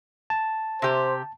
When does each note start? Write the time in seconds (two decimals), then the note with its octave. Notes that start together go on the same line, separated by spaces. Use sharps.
0.30 A5
0.82 C3 G4 C5